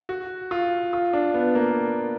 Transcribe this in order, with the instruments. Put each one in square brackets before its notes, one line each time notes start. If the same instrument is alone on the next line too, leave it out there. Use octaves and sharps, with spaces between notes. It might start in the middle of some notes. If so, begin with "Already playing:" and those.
[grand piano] F#4
F4
F4
D4
B3
A#3